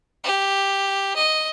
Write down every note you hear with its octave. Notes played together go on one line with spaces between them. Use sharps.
G4
D#5